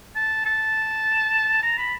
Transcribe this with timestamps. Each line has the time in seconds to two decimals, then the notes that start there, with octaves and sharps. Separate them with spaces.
0.16 A5
0.45 A5
1.63 A#5
1.78 B5